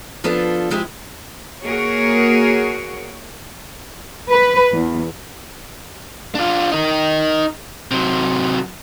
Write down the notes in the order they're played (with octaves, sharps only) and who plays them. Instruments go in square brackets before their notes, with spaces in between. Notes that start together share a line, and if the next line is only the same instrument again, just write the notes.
[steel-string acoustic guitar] F3 B3 D4 F4 A4
F3 G#3 E4 G4
[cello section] A#3 F#4 G#4 A#4 C#5
B4
E2
[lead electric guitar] D4 F4
D#4 A#4
C3 F#3